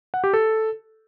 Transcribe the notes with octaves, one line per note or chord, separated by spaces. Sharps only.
F#5
G4
A4